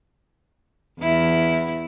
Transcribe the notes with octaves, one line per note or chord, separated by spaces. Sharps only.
E2 E4